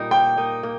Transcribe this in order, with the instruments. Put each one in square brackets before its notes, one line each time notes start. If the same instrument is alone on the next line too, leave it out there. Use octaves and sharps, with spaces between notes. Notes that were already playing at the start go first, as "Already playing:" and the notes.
Already playing: [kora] A#2 G3 D#4 A#4
[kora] A#3 [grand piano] G5
[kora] D#4 A#4 D#5
A#3